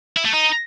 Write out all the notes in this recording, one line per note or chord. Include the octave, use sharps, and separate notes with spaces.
E4
A3
D#4